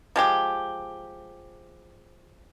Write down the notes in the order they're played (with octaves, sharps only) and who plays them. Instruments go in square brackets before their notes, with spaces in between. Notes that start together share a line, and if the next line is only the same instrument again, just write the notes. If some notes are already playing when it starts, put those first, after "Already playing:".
[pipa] F3 G#3 G4